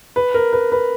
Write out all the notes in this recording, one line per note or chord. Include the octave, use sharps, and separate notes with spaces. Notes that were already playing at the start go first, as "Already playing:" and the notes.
B4
A#4
B4
B4